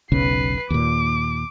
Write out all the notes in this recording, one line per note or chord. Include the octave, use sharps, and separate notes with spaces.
E1 B1 C#3 B4 C7
D#2 A#2 D6